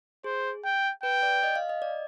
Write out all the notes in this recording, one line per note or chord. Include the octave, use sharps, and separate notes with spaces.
G#4 C5
G5
B4 G5
D5
D#5
F5
D#5
D5